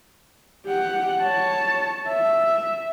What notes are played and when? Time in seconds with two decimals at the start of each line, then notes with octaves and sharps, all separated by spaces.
0.67 G4 F#5
1.22 C#5 A5
2.08 E5